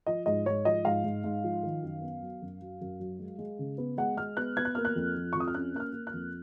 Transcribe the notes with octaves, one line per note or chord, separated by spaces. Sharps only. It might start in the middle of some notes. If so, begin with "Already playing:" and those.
F3 D#5
G#2 D#5
G#2 C#5
F3 D#5
G#2 F5
G#2
G#2
F3
D#3
F#2
B3
F#3
F#2
F#3
F#2
F#3
G#3
G#3
C#3
B3
G#3 F#5
G#3 F6
B3 F#6
B3 G#6
F#6
A#3 F6
F#6
F2
F3
C#6
F2
D#6
F6
C#4 F#6
A#3 F#6
F6
A#3
F#6
F2